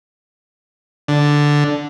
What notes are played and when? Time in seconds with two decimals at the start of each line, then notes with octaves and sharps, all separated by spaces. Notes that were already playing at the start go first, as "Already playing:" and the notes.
1.08 D3